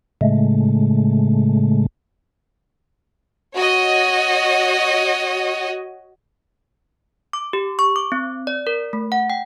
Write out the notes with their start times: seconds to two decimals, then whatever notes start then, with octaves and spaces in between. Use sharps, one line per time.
0.21 A2 C#3 G#3 A3
3.56 F#4 C#5 D#5
7.33 D6
7.53 G4
7.79 C#6
7.96 D6
8.12 C4
8.47 D5
8.67 A#4
8.93 A3
9.12 F#5
9.30 G5